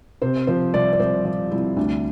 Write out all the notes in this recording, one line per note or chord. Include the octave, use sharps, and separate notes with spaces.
C3 C5
F3 C5
C2 D5
D5
C2 C5
F3 D5
C2 E4
D2 D4